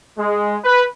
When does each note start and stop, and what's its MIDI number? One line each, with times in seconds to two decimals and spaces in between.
0.18 0.56 56
0.64 0.83 71